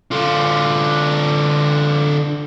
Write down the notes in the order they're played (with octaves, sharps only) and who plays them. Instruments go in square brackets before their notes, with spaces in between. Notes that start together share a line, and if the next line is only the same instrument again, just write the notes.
[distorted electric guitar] D3 F4